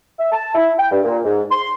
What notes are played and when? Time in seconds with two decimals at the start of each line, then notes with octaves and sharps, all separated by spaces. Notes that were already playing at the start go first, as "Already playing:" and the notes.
0.19 E5
0.32 A5
0.55 E4
0.78 G5
0.91 G2
1.04 A#2
1.24 G#2
1.51 C6